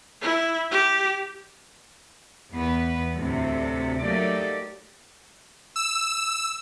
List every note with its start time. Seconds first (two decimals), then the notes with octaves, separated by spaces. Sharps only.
0.21 E4
0.71 G4
2.56 E2 B3 B4
3.16 D2 A2 C3 A3
4.02 F#3 A3 A#3 D#4 G4 D5
5.76 E6